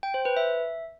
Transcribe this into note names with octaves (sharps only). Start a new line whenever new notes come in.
G5
C5
B4
E5